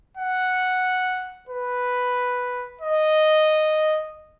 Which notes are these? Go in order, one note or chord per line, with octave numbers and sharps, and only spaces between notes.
F#5
B4
D#5